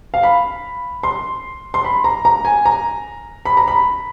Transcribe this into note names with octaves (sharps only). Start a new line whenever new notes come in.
F5
B5
C6
C6
B5
A#5
A#5
G#5
A#5
B5
A#5
B5